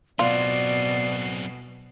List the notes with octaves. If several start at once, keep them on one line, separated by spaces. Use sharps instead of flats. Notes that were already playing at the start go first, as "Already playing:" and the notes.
B2 F#3 C4 F4 D5